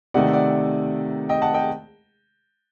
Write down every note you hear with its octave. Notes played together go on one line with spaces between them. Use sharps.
C3 D#3 A3 D5 F#5
D5 F#5
D#5 G5
F#5 A5
D#5 G5